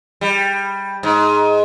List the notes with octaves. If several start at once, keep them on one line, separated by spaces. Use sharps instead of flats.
G3
G#2